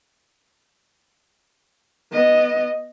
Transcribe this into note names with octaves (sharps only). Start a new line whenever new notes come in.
B3 D#5